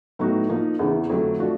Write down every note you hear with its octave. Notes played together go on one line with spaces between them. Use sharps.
A2 F#3 B3 D#4 F#4
F3 A#3 D#4
E2 C#3 E3
F2 D3 F#3 A3
F3 A3 D4 F#4